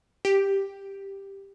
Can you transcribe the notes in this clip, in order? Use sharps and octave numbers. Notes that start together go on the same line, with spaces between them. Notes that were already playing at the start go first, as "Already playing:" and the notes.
G4